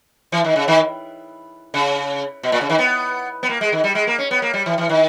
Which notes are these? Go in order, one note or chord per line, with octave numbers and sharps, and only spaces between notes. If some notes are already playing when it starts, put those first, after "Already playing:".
E3
D#3
C#3
D#3
C#3
B2
A#2
C#3
D#3
B3
B3
A#3
G#3
D#3
G3
G#3
A#3
C#4
B3
A#3
G3
E3
E3
D#3